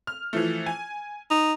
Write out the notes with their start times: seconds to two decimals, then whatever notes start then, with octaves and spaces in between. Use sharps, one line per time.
0.07 F6
0.33 E3 F3 A3
0.66 G#5
1.30 D#4